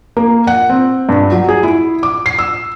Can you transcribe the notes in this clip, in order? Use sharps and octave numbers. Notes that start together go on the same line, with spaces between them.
A#3
F#5
C4
G2
F#3
G#4
E4
D6
C7
E6